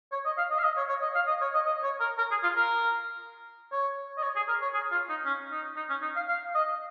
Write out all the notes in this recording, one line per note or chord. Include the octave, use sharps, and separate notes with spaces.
C#5
D#5
F5
D#5
F5
D#5
C#5
C#5
D#5
F5
D#5
C#5
D#5
D#5
C#5
A#4
A#4
G#4
F4
A#4
C#5
D#5
C#5
G#4
A#4
C#5
G#4
F4
D#4
C#4
D#4
D#4
C#4
D#4
F5
F5
D#5